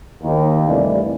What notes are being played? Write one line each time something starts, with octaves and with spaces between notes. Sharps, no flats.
D#2
G2 C3 E3 A3 D5